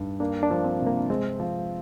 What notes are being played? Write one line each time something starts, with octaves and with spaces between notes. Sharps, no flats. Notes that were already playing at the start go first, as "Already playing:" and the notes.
Already playing: G2 D#4
A#3 D4
D4
F3
C4
C3
A#3
G#3 C4
F3